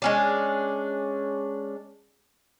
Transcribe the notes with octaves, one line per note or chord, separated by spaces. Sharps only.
G#3 C#4 D4